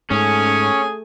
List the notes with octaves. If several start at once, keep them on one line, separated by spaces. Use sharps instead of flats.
G#2 A3 C#4 G#4 G#5